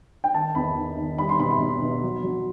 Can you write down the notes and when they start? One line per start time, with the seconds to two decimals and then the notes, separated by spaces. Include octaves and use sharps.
0.24 G5
0.34 D#3 A5
0.55 E2 B5
0.76 D#3
0.98 D#3
1.18 G3 B5
1.29 C6
1.40 B2 B5
1.51 C6
1.60 B2
1.82 B2
2.03 F#3
2.23 F#3